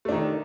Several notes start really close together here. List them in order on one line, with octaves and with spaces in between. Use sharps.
A3 D4 D#3